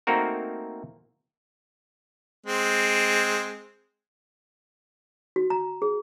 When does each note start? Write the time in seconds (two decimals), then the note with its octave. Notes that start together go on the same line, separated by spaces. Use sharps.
0.07 A3 A#3 C4 D#4 F#4 A#4
2.46 G#3 C4
5.36 F#4
5.50 A#5
5.82 G#4